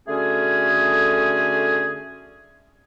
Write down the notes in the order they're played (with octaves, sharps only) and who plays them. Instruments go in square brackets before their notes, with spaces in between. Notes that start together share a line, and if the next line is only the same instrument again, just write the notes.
[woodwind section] D3 A3 C#4 F#4 G#4